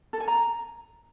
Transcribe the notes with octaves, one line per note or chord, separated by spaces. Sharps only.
A4
G#5
A#5